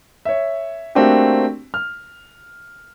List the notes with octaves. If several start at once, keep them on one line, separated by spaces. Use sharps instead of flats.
C#5 E5
A3 A#3 C4 D4 F#4 G4
F6